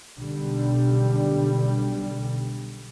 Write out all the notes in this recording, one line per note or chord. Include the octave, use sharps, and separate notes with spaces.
B1 D3 G3